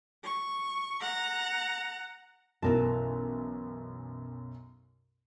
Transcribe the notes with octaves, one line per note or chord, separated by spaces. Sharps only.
C#6
F#5 A#5
B1 F#2 E3 A#4 A5